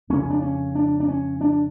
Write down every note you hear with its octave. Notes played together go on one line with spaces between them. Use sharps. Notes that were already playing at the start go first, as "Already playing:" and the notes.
F2 C#3 C#4
D4
C#4
D4
D4
C#4
D4